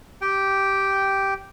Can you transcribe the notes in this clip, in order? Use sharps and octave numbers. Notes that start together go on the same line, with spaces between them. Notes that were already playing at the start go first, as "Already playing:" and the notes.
G4 G5